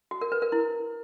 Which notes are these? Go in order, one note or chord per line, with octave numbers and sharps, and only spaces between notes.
F#4
A#4
B4
A#4
E4